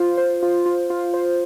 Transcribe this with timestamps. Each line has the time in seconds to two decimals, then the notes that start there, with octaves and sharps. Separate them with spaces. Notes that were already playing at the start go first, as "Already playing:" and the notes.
Already playing: F4 C5
0.18 C5
0.43 F4
0.66 F4
0.90 F4
1.14 C5